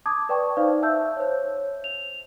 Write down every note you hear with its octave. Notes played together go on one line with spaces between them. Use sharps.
A5 D6 D#6 G#6
B4 D5 G5 A5 C#6
D#4 C5 D5 F5
E5 A5 E6 G6
C5 C#5
F7